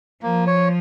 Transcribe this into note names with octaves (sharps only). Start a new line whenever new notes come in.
F3 A#3
C#5